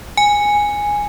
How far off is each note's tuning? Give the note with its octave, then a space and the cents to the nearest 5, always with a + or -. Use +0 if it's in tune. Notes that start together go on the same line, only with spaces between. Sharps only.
G#5 -5